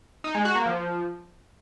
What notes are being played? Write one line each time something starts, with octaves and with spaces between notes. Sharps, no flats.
D#4
G#3
F#4
A#3
F3